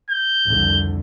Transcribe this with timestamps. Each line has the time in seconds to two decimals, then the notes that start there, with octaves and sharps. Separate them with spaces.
0.11 G6
0.48 C2 F2 D3